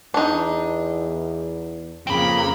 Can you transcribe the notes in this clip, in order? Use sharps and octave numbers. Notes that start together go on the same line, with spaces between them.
E2 D4 D#4
F2 C#3 A#3 C4 B5